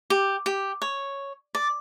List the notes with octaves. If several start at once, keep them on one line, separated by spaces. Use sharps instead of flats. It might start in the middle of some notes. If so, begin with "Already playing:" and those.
G4
G4
C#5
D5